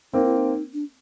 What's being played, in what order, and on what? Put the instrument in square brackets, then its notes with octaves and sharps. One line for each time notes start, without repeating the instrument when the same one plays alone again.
[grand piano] A#3 C4 [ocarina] D#4
[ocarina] E4
D#4
D4